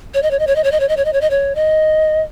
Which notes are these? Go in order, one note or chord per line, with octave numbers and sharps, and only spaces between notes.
C#5
D#5
C#5
D#5
C#5
D#5
C#5
D#5
C#5
D#5
C#5
D#5
C#5
D#5
C#5
D#5